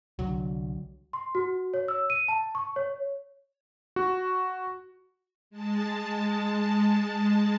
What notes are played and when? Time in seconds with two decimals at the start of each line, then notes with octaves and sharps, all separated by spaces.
0.19 C2 D3 F#3
1.13 C6
1.35 F#4
1.74 C#5
1.88 E6
2.10 D#7
2.28 A5
2.55 C#6
2.76 C#5
3.96 F#4
5.50 G#3 A5